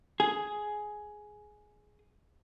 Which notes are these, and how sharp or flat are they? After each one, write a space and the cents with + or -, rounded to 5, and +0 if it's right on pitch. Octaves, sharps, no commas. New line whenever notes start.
G#4 +10